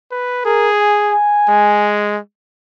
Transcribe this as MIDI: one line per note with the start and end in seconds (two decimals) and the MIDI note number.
0.11 0.40 71
0.45 1.14 68
0.45 0.70 70
0.81 2.17 80
1.49 2.18 56